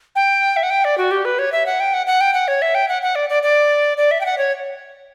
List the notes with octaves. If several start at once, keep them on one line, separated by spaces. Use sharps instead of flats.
G5
E5
F#5
G5
D5
F#4
G4
B4
C#5
E5
F#5
G5
F#5
F#5
G5
F#5
C#5
E5
G5
F#5
F#5
D5
D5
D5
D5
E5
G5
F#5
C#5